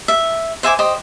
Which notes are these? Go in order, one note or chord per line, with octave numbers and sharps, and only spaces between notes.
E5
C5 E5 G#5 D6
G4 C5 D#5